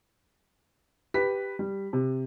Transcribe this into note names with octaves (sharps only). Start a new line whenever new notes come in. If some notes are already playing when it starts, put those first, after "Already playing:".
G4 B4 B6
G3
C3